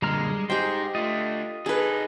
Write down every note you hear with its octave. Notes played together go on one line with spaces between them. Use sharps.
F#2 A#2 D3 G3 G#3 A#5 F6
G#2 D#4 G4 G#4 C5 G5
A3 D4 F4 D#5
D#4 G#4 A4 B4